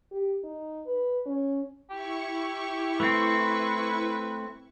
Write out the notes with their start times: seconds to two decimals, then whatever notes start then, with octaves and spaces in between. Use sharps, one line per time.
0.11 G4
0.44 D#4
0.86 B4
1.26 C#4
1.90 E4 G4 C#6
3.00 A3 C4 B4